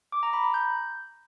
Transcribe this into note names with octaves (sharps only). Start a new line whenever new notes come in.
D6
A#5
B5
A#5
G6